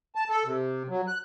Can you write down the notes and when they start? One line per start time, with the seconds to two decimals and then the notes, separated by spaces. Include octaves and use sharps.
0.15 A5
0.30 A4
0.45 C3
0.89 F#3
1.07 F#6